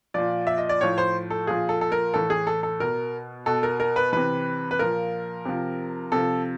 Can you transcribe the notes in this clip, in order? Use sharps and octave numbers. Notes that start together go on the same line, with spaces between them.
A#2 F3 D5
E5
D#5
D5
A2 F3 C#5
C5
A4
A#2 F3 G#4
A4
A4
A#4
A2 E3 A4
G#4
A4
A4
B2 A#4
B2 A4
A#4
A#4
B4
C3 E3 B4
B4
A#2 F3 A#4
C3 F3
C3 F3 A4